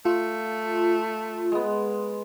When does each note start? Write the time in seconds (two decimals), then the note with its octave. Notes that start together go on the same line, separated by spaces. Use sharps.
0.05 A3 F4
1.52 G#3 B3